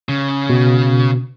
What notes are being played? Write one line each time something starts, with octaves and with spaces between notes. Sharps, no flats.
C#3
B2